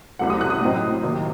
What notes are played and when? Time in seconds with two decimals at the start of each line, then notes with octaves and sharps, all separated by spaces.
0.19 C2 C3 F#3 A3 F#5
0.30 D#6
0.41 F#6
0.50 D#6
0.61 A2 F#3 C4 D#4
1.03 C3 D#3 F#3 A#3